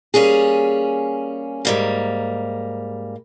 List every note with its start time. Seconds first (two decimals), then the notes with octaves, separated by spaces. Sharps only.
0.14 G3 A#3 C#4 G#4
1.65 G#2 G3 A#3